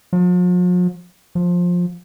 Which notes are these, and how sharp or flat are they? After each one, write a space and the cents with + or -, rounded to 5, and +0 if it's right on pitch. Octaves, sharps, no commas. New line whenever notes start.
F3 +45
F3 +15